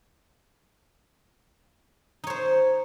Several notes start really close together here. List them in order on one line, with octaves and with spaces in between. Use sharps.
D#4 C#5 C5